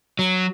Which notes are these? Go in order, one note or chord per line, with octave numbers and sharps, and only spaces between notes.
F#3